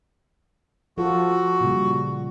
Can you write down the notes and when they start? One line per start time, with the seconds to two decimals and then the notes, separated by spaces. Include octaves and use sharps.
0.98 F3 F4 F#4 A4
1.61 A#2 C#3 G3